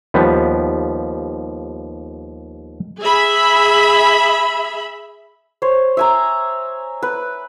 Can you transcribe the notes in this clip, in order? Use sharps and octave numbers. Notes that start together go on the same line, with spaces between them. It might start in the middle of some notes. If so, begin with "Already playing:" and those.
D#2 F3 G3 B3
G#4 E5 B5
C5 C#5
E5 G#5 A#5
B4